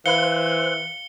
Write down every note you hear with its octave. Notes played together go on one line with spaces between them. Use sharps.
E3 C5 F5 B5 F#6 C#7 G7